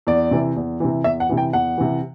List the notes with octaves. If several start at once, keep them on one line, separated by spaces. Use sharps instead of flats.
E2 D5
C3 E3
E2
C3 E3
E2 E5
F#5
C3 E3
G5
E2 F#5
C3 E3